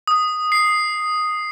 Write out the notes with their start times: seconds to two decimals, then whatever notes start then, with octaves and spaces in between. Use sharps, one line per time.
0.07 D#6
0.52 C7